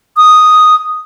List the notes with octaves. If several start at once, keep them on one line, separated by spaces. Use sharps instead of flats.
D#6